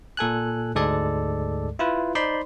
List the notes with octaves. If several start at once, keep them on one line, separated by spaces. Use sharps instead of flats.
A#2 A4 G#5 F#6
D2 G#2 G#3 A4 D5
E4 F4 B4
D#4 C5 D5 B5 C6